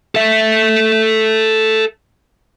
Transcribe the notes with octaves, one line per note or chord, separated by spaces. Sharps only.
A4 E5